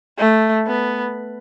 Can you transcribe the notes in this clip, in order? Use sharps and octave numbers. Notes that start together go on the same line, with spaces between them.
A3
B3